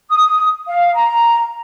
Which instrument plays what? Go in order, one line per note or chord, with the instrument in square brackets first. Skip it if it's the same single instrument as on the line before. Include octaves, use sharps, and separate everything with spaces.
[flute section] D#6
F5
A#5